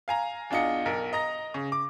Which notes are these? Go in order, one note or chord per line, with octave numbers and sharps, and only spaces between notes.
F5 G#5 A#5
E2 D4 F4 D#5 C#7
B1 A#4
D#5 A#5 A#6
C#3
D6